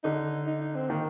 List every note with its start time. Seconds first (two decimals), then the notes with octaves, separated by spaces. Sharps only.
0.04 D3 D#4
0.46 D#4
0.61 D#4
0.75 C4
0.89 D#3 A#3